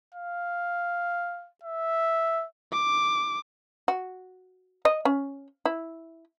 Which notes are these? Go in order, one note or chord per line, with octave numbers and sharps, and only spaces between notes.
F5
E5
D6
F#4
D#5
C#4
E4